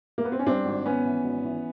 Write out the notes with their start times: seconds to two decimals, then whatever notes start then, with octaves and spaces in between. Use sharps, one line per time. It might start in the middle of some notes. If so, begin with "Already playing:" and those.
0.18 A#3
0.25 B3
0.32 C4
0.39 C#4
0.46 G2 C4 D4
0.66 G#1
0.86 G#1 B3 C#4
1.05 E3
1.24 G#1
1.44 E3